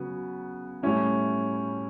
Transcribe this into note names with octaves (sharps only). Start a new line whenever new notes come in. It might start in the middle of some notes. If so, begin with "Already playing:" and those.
Already playing: C#3 F#3 B3
A2 G3 C#4 E4